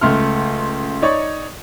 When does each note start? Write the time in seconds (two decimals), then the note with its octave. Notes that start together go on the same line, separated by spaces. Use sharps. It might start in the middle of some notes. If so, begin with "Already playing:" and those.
0.01 C#2 A3 C6 F6
1.02 D#4 C#5 D5 C#6